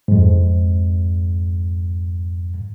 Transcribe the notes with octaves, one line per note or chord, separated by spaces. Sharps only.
F2 G#2